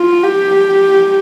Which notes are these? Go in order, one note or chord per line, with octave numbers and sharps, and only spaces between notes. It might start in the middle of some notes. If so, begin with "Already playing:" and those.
Already playing: F4
G4